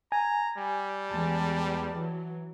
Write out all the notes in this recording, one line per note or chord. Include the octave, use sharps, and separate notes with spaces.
G#5 A#5
G3
E2 G#3 A5
E3 F#3